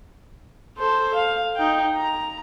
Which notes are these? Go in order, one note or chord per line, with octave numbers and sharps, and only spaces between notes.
A4 C5
F5
D#4 G5
A#5